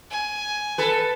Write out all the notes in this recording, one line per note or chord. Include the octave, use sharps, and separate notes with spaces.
G#5
A4 B4